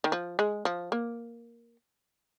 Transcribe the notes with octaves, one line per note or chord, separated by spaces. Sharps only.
D#3
F3
G#3
F3
A#3